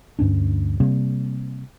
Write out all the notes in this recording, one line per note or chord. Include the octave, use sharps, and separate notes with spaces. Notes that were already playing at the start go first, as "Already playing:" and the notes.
D2 G2 C#4 D4
C3 G3 A#3 C4